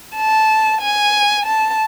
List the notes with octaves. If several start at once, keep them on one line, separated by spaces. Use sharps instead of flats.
A5
G#5
A5